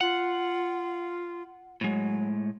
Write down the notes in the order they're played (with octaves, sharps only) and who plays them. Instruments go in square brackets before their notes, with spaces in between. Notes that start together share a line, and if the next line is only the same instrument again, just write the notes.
[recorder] F4 [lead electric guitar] F#5
[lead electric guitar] A2 G#3 [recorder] F#3